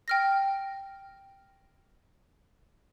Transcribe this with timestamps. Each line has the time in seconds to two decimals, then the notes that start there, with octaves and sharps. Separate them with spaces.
0.08 G5 F6 A#6